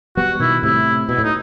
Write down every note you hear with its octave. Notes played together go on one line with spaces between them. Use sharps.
G3 B3 F#4
B2 D#3 E4
A2 C3 E4
B2 E4
A2
D#4